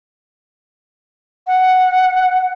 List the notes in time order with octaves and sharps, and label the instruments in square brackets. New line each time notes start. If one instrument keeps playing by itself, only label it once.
[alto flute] F#5